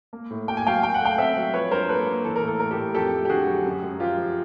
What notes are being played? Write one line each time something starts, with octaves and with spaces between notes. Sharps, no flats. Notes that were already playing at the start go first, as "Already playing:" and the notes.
A#3
A2
A#3 G5
G#5
F#3 F5 G5
F#3 G5
F#5
A3 F5 G5
C4 E5 F#5
F#3
F3 B4 C#5
G2 A#4 C5
A#3 A4 B4
A#3
E3 A4
A#4
A2
A4
A2 A#4
G4 A4
A2
F2 G4 A4
A3
G4
D3 F#4 G#4
F#3
F#2
F#2
F3 F4 G4
F3